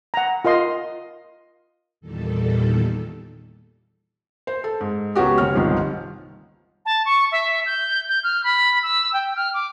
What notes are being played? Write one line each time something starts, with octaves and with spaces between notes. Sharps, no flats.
F#5 A#5
F4 A#4 D#5 C6
E2 A#2 D#3 G3 A4
C5
A4
G#2
C#2 B3 C#4 F#4 G4
F#1 C#5 F6
G1 C2 D#3 F3
A5
C#6
E5
G6
G6
F6
B5
E6
G5
F6
D6